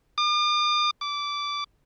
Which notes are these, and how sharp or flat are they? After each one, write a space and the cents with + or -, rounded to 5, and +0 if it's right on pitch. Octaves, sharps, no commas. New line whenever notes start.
D6 +45
D6 -15